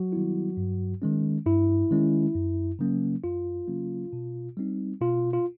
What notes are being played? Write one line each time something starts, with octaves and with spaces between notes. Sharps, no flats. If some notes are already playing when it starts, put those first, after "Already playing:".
Already playing: F#3 F#4
D#3 G3 B3 E4
G2
D#3 G#3 C#4
G2 E4
D#3 G#3 C#4
F#2
C#3 F#3 A#3 C#4
F#2 F4
C#3 F#3 A#3 C#4
B2
G3 C4 D#4
B2 F4
F4